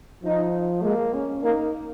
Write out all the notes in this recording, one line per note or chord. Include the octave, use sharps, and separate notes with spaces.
F3 D#4
G#3 A#3
C#4
A#3 D#4